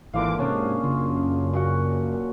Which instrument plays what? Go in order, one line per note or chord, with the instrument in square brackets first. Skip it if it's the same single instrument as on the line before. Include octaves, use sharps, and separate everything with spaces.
[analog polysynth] G#1 E3 D6 [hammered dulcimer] A#2 D3 F5
[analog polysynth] G#2 C3 [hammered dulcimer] C#4 D4 G#4
[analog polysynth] F#2 C#3 [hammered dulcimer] F4
[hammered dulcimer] A#2 F#4 F#5